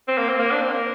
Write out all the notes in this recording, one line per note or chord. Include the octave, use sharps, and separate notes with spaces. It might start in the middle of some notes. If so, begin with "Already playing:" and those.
C4
A#3
C4
A#3
D4
C4
A#3